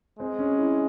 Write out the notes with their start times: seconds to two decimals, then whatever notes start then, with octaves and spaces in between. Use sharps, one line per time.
0.19 G#3 C4
0.39 C#4
0.58 E4